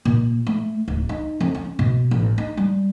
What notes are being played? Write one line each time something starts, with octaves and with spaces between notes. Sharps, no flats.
A#2
A3
D1
D#4
F2
C#4
B2
A1
D#4
G3